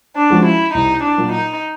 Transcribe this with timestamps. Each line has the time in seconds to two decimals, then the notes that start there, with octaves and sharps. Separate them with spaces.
0.16 D4
0.30 F3 G#3 C#4 F#4
0.45 E4
0.74 C2 D#4
1.03 D4
1.17 A#2 F#3 A#3
1.32 D#4